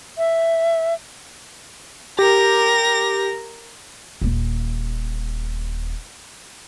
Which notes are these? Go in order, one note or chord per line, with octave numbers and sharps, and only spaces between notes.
E5
G4 A#4 A#6
D#1 A#3